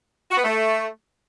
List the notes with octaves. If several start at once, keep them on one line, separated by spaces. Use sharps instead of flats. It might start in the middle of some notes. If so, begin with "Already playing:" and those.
F#4
B3
A3